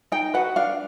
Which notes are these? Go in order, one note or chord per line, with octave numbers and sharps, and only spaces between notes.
D#4 G5
F#4 B4 F#5
D4 F5